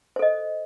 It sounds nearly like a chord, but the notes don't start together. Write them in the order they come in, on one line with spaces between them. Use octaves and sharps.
C5 A4 D#5